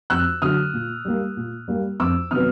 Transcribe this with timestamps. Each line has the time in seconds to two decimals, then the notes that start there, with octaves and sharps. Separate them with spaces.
0.10 F2 E6 F#6
0.42 D3 F#3 D#6 F6
0.73 A#2
1.05 G3 A#3
1.37 A#2
1.68 G3 A#3
1.99 F2 D6 E6
2.31 C3 D#3 F#3 B3 D#6 F6